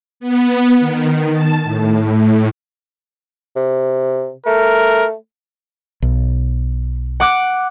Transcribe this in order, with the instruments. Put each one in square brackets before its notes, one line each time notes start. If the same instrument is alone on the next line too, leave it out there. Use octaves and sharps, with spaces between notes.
[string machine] B3
D#3
A5
A2
A2
[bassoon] C3
[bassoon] A3 [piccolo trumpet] A#4
[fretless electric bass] B1
[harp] F#5 D6 F#6